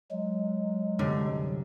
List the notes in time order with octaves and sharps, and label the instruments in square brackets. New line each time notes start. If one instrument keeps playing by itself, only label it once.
[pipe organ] F#3 G#3
[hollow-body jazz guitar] C2 F#2 D3